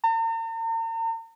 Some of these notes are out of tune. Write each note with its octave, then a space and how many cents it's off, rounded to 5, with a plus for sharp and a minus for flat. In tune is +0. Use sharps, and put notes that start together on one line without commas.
A#5 -45